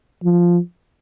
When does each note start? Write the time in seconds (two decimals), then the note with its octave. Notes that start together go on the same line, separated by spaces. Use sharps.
0.24 F3